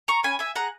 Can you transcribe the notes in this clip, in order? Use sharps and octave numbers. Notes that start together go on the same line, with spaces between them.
A#5 C#6
C#4 G#5 B5
E5 G#5
G#4 F#5 A#5